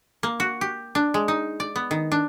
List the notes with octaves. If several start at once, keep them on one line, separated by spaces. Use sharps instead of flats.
A#3
F#4
G4
D4
G#3
D#4
D5
B3
D#3
D4